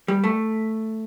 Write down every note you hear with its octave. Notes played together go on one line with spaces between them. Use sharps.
G3
A3